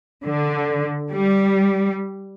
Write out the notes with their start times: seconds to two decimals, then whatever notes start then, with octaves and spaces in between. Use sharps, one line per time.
0.24 D3
1.09 G3